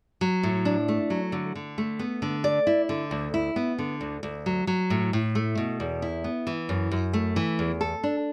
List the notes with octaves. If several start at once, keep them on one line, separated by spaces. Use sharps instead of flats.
F#3
A2
D4
A3
F#3
D3
D3
A3
B3
D3
D5
E4
D3
D2
E4
B3
D3
D2
D2
F#3
F#3
A2
A2
A3
B2
E2
E4
B3
E3
F#2
F#2
A3
E3
E2
A4
D4